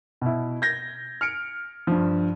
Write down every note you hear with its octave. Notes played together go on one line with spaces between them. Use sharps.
B2 E4
G6 G#6 A#6
F6 C#7 D7
G2 F3